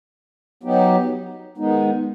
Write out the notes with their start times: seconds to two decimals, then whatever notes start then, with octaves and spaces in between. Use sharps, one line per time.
0.63 F#3 B3 D#4 G4
1.57 D#3 G#3 B3 D#4